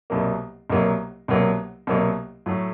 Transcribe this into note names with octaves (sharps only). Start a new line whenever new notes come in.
C2 B2 F#3 A#3
C2 B2 F#3 A#3
C2 B2 F#3 A#3
C2 B2 F#3 A#3
A2 F#3 A3